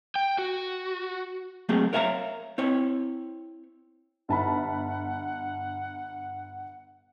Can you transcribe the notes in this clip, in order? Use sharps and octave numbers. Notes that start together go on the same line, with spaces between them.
G5
F#4
F#3 A3 A#3 C4 G#4
A#4 C#5 E5 F5 G#5 A#5
C4 E4 C#5
G1 F#5 A5 B5